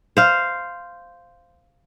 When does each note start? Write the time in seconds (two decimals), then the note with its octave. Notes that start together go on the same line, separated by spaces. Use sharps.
0.17 C5 F5